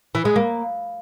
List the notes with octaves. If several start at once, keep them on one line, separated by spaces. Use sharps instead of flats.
E3
G#3
A#3